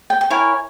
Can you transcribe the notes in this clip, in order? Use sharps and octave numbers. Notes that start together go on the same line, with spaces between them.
G5
G5
E4 A#4 C#5 G#5